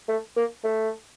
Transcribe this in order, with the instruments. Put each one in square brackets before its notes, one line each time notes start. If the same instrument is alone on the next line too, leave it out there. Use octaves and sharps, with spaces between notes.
[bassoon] A3
A#3
A3